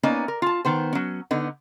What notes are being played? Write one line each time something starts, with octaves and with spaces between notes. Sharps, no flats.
A#3 B3 C#4 D#4 D5 D#5
A#4
F4 A5
D#3 B3 C5
F#3 C#4
D3 B3 D#4